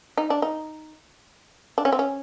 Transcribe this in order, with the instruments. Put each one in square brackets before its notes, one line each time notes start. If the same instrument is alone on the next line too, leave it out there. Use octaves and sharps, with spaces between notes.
[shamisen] D#4
D4
D#4
D4
C#4
C4
C#4